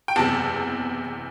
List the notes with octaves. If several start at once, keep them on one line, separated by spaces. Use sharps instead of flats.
G5
F#1 E2 C3 A5